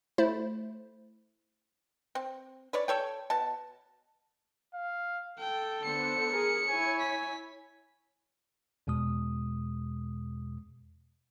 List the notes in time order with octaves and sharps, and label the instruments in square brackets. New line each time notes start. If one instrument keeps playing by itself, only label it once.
[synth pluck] A3 E4 C5
[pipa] C4
B4 C#5 D5
A4 C#5 G5
B2 A5
[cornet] F5
[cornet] A4 [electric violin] G5
[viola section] D3 B3 C5 [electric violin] C#7
[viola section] G#4 [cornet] A#4
[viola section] E4 C#5 [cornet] G#5
[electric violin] B6
[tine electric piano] E2 B2 G#3 D#6